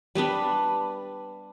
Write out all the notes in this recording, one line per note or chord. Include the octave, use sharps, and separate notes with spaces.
G3 B3 D4 B4